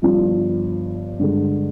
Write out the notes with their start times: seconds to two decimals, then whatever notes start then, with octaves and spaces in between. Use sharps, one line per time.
0.02 G1 G2 F3
1.19 G2 D3 G#3